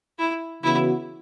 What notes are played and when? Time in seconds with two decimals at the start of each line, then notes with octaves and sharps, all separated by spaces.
0.19 E4
0.63 C#3 E3 B3 E4 F#4